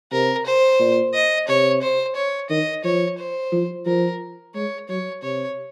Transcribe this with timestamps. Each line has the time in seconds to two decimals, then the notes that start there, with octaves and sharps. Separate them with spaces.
0.12 C3 A#4
0.46 C5
0.79 A#2
1.14 D#5
1.47 C3 C#5
1.82 C5
2.15 C#5
2.50 D#3 D#5
2.84 F3 C#5
3.19 C5
3.52 F3
3.86 F3 A#4
4.54 G#3 C#5
4.89 F#3 C#5
5.23 C3 C#5